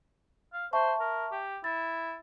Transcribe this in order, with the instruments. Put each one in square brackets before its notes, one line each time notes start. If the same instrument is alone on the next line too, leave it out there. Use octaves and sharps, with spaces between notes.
[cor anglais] F5
[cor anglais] C5 [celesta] E5 A5 C#6
[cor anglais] A#4
G4
[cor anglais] E4 [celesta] A6